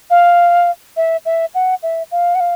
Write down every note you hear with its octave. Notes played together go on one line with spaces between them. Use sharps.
F5
E5
E5
F#5
E5
F5
F#5
F5